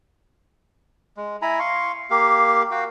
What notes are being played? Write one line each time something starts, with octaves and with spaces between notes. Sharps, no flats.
G#3
E4 G#5 A#5 B5
F5 C6 C#6
A#3 G4 F5
F#4 F5 G5